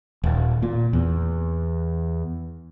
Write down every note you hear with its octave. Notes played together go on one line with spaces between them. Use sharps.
D#1
A#2
E2